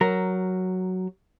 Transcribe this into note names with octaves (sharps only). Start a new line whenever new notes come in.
F#3 A#4